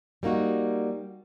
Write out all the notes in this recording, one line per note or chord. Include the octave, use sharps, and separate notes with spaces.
G3 A#3 D#4 F#4